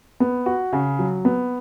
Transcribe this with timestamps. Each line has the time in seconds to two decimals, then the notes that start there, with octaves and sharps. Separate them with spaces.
0.20 B3
0.46 F#4
0.73 C#3
0.99 F#3
1.25 B3